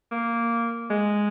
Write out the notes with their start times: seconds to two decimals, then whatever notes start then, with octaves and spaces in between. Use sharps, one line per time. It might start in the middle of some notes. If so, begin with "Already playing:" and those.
0.12 A#3
0.90 G#3